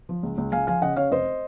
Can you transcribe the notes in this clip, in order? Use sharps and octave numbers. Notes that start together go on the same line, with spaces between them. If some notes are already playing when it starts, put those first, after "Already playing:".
F3
C#2
C#2
C#2 F5 G#5
F3 F5 G#5
C#3 D#5 F#5
C#3 C#5 F5
F1 C5 D#5